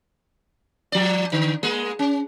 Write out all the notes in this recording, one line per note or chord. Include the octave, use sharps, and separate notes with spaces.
F3 D5
D3
G#3 A#3 G#4
C#4